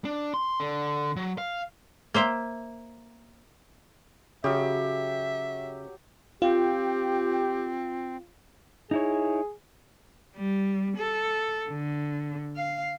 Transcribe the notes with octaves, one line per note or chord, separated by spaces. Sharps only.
D4
C6
D3
F#3
F5
A#3 C5 E5 G5
C#3 F#3 G4 E5
C4 F4 G4
D#4 E4 G#4 C#5
G3
A4
D3
F5